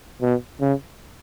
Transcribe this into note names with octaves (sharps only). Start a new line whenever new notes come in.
B2
C#3